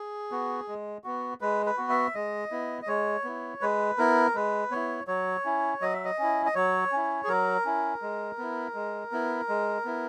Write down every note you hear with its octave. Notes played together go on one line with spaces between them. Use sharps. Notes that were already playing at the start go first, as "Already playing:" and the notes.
Already playing: G#4
B3 F#4
G#3
B3 F#4
G#3 B4
B4
B3 F#4
E5
G#3 D#5
B3 E4
D#5
G#3 C#5
B3 E4
G#3 B4
B3 E4 A#4
G#3 B4
B3 E4 C#5
F#3 C#5
C#4 E4
F#3 D#5
E5
D#5
C#4 E4
D#5
F#3 C#5
C#4 E4
G#4
F#3 A#4
C#4 E4
G#3
B3 E4
G#3
B3 E4
G#3
B3 E4